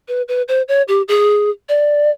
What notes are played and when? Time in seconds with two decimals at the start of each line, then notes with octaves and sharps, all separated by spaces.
0.08 B4
0.28 B4
0.48 C5
0.68 C#5
0.88 G4
1.08 G#4
1.69 D5